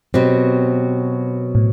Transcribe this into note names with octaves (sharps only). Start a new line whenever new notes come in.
B2 F#3 C4 G4
A2